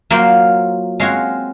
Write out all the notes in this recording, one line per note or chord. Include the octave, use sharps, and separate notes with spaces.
F#3 A#3 F4 C5
G#3 C4 F#4 C#5 F5